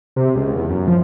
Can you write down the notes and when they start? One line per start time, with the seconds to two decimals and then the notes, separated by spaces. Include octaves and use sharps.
0.16 C3
0.35 C#2
0.55 E2
0.69 F#2
0.87 F3